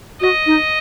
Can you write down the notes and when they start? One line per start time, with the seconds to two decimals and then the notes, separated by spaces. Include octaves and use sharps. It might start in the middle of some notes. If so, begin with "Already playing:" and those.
0.21 F#4 D#5
0.46 D#4